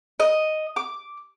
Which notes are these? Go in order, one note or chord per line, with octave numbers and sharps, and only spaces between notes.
D#5
D6